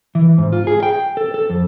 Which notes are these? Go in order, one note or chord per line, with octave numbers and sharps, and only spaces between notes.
E3
G#2
F4
G#4
G5
A4
A4
F2